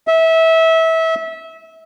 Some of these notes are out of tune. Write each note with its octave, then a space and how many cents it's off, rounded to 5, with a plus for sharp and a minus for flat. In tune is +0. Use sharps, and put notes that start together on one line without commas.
E5 -25